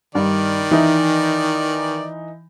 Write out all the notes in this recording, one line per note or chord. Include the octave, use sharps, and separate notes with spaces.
G2 D#3 D5
E3 D#4 E5